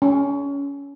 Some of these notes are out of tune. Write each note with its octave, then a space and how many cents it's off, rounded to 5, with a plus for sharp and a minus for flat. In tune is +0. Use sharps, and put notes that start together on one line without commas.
C#4 +25